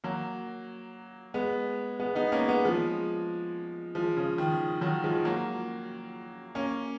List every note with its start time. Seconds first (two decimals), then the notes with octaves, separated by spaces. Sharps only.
0.04 F#3 A#3
1.34 G#3 B3
2.00 G#3 B3
2.15 B3 D#4
2.32 A#3 C#4
2.48 G#3 B3
2.65 F3 G#3
3.95 F3 G#3
4.17 C#3
4.38 D#3
4.81 D#3 F#3
5.04 F3 G#3
5.25 F#3 A#3
6.55 A#3 C#4